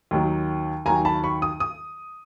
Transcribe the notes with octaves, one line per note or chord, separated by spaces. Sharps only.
D#2 D#3 F#3
D#2 D#3 F#3 G#5 A#5
A5 B5
B5 C#6
D#6
D#6